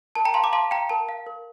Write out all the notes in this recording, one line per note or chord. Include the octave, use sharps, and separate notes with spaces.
A#4 A5
G5 A#5
F5 A5 C6
A#5 D6
F5 A5 C6
F5 G5 A#5
A#4 A5
F5
A#4